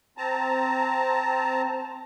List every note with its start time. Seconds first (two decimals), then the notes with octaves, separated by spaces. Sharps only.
0.18 C4 A5 A#5